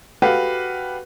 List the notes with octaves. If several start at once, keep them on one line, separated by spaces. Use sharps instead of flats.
F#4 G4 A4 B4 F5 F#5